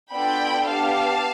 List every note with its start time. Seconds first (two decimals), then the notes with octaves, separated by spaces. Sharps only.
0.12 B3 D4 F4 A4 G5 B5
0.68 B3 D4 G4 F5 A5